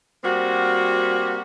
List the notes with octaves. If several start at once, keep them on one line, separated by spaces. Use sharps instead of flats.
G3 A#3 C4 F#4